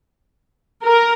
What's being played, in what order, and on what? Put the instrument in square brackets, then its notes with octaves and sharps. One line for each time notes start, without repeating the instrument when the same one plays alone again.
[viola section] A#4